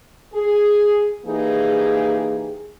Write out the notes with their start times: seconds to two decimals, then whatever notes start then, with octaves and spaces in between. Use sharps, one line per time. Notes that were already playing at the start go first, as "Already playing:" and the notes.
0.33 G#4
1.26 E3 A#3 D#4 G4 G#4